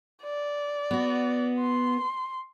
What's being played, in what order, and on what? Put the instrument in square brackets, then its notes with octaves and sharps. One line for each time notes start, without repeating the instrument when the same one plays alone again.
[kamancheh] D5
[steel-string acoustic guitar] B3 F#4
[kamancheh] C6